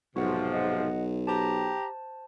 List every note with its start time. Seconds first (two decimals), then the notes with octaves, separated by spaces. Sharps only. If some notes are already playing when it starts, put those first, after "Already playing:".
0.16 B1 G#2 C3 F3 F#4 F#5
0.53 D#5 F#5
1.27 G4 C5 A5 A#5